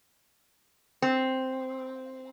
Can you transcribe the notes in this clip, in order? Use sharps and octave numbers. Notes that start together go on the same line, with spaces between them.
C4